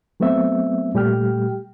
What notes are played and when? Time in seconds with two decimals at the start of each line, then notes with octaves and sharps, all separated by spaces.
0.20 F#3 A3 B3 C4 E5
0.94 A#2 G3 A3 G4 G5 F6